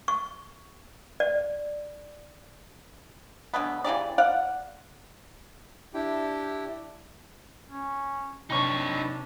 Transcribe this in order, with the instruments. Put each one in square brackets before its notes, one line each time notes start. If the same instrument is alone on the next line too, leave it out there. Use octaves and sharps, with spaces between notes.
[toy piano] C#6
D5
[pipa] D3 F#3 G#3 B3
C#3 E3 G4 D5
D5 F5 F#5
[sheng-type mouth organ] D4 E4 G4 G5
[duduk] C#4
[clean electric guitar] C3 C#5 [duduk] D4 [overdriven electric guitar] D#4 B4